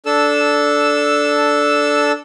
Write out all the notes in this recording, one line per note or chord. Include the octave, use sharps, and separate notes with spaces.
D4 A4 E6